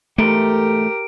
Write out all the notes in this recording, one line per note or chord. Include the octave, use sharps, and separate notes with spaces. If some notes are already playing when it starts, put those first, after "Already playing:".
E2 G#2 A3 G4 A4 A#4 D7